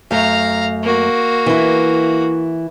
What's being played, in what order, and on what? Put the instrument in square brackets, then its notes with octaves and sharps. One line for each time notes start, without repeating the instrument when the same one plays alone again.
[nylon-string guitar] F#2 A3 [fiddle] F5 A#5
[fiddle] A#3 F#4
[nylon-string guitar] E3 E4